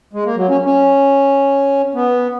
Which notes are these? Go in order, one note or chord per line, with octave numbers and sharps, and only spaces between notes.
G#3
A#3
F#3
C#4
C#4
B3